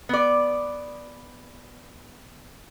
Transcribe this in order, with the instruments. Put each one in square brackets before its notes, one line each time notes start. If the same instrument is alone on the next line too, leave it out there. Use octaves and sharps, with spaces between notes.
[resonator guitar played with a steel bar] B3 D5